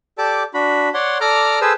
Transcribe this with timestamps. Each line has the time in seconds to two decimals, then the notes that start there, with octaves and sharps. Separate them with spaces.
0.18 G4 A4 D5 A5 D6
0.54 D4 F#4 B5
0.94 C#5 D5 F#5 C6
1.21 A4 D5 A#5 D6 F6
1.61 G#4 A4 B4 C5 E6